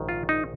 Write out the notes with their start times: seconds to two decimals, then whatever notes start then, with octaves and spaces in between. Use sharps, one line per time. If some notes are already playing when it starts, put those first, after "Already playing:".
Already playing: A#1 G#2 D#3
0.09 F4
0.29 D#4